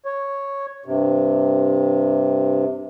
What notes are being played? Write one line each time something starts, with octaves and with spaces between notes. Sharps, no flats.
C#5
G2 C3